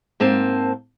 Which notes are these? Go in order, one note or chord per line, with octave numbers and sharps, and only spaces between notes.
G#2 A#3 C4 A5